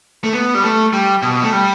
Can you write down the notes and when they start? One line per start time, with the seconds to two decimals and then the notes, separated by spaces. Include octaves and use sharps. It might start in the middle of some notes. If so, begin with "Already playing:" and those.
0.24 A3
0.33 B3
0.54 G3
0.63 A3
0.93 G3
1.22 B2
1.43 A3
1.53 G3